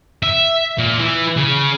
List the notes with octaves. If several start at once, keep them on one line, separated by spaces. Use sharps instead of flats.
E5
A#2
E3
C#3